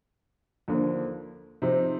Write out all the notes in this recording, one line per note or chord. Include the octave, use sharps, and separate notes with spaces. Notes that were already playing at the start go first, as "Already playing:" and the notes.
D#2 D3 F3 A#3
C3 F3 C4 D#4